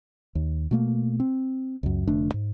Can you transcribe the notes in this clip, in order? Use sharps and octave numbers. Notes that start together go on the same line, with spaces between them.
D#2
B2 A3 A#3
C4
C#2 F#2
F1 D3 A3 D4
G#2